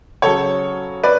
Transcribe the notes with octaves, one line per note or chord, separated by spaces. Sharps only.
C#3 F#3 A4 C#5
B4 D5